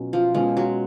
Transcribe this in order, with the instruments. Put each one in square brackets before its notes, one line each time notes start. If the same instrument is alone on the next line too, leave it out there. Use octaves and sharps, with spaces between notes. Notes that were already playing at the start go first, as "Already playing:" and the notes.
Already playing: [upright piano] B2 F#3 C#4 F4
[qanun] F3
[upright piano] B2 G#3 C#4 F4 [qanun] F3
[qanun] F#3